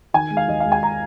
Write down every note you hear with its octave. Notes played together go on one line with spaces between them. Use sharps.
D#3 G#5
G#3
F5
D#2 D#5
G#3 F5
G#5
A#5